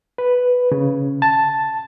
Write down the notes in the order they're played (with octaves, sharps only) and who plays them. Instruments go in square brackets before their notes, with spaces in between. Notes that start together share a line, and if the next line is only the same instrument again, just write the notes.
[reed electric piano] B4
C#3
A5